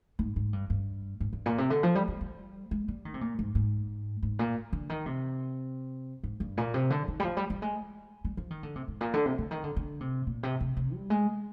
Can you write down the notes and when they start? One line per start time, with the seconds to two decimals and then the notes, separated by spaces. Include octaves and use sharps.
0.19 G#2
0.36 G#2
0.53 G2
0.70 G2
1.20 G#2
1.33 G2
1.46 A#2
1.58 C3
1.70 D3
1.83 F3
1.95 G3
2.08 G3
2.21 G3
2.71 G#3
2.88 G3
3.05 D#3
3.14 C3
3.21 A#2
3.39 G#2
3.55 G#2
4.23 G#2
4.39 A#2
4.73 D3
4.89 D#3
5.06 C3
6.23 G#2
6.40 G2
6.57 A#2
6.74 C3
6.90 D3
7.08 D#3
7.20 G3
7.24 F3
7.37 G3
7.50 G3
7.62 G#3
8.25 G3
8.37 F3
8.51 D#3
8.63 D3
8.75 C3
8.88 G#2
9.01 A#2
9.14 D3
9.26 C3
9.38 D3
9.51 D#3
9.64 D3
9.76 D3
10.01 C3
10.27 A#2
10.43 C3
10.60 C3
10.77 C3
10.94 G3
11.10 G#3